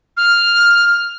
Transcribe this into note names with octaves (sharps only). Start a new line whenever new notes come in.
F6